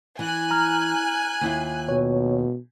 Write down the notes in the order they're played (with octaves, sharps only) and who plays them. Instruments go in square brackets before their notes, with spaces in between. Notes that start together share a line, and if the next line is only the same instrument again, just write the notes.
[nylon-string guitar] E3 [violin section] G#5 F#6
[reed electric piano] A#5 F6
[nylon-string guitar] D#2 E4 F4
[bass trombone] B2 [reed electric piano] C#5